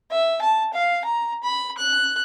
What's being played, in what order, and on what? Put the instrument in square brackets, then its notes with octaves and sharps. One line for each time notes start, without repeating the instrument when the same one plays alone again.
[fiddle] E5
A5
F5
A#5
B5
F#6